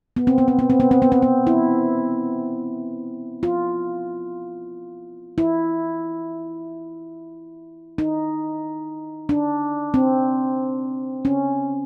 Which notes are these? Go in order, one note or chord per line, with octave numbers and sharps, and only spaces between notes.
B3
C4
B3
C4
B3
C4
B3
C4
B3
C4
B3
E4
F4
E4
D#4
D4
C4
C#4